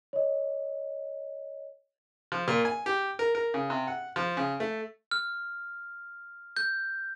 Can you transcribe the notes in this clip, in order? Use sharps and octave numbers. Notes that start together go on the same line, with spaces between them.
C#5 D#5
F3
A#2
G#5
G4
A#4
A#4
C#3
C3
F#5
F3
C#3
A3
F6
G6